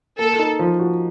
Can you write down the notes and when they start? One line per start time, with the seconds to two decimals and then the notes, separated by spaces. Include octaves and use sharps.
0.19 A#3 A4
0.39 D#4
0.59 F3
0.79 F#4